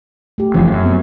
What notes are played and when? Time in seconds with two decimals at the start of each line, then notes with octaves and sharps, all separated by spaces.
0.38 A3 G4
0.54 F1 E3 F3 C#4
0.72 F#2
0.84 B3 C4